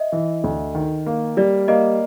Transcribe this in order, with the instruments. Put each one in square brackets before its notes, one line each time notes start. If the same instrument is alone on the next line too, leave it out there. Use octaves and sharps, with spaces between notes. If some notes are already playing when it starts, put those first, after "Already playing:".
Already playing: [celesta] D#5 E5
[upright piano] E3
D2
D#3
A#3
[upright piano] G3 [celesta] D5
[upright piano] A#3 [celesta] D#5